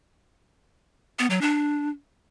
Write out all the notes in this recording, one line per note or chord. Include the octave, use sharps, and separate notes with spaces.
B3
F#3
D4